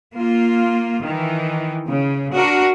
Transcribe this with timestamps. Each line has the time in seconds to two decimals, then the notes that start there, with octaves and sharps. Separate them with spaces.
0.16 A#3 F4
1.05 D#3 E3
1.88 C#3
2.35 D4 F#4 A#4